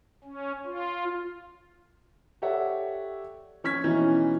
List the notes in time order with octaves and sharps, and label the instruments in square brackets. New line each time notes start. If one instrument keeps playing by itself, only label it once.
[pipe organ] C#4
F4
[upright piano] G4 A4 C#5 D5 E5 F#5
F3 C#4 C#6 F6 G#6 B6
B2 E3 C#4 D#4 E4